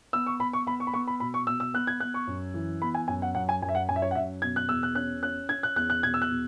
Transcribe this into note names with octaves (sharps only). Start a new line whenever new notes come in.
B3 E6
C#6
B3 B5
C#6
B3 B5
C#6
B5
B3 C#6
B5
B2 B5
C#6
B2 E6
E6
B3 F#6
G#6
B3 F#6
C#6
F#2
E3
B3 B5
G#5
F#2 G#5
F#5
F#2 F#5
G#5
F#2 G#5
E5
F#5
F#2 G#5
E5
C#5
F#5
F#2 E5
B2 G#6
F#6
E2 E6
F#6
C#4 F#6
C#4 F#6
C#4 G#6
F#6
E2 F#6
F#6
B2 G#6
E6
F#6
B2